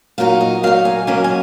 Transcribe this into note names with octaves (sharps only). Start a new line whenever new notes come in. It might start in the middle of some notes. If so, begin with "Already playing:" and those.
A#2 F#3 A#3 D#4 F5
D#5
A#2 F#3 A#3 D#4 F5
G#5
B2 F#3 A#3 C#4 G#5
G#5